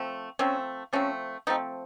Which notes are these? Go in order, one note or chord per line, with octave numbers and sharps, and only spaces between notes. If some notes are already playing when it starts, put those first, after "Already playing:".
Already playing: F3 A3 C4
F3 A3 C4 C#4
F3 A3 C4 C#4
F3 A3 C4 D#4